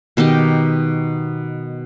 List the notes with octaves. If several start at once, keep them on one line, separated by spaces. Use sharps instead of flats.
B2 D#3 D#4 G4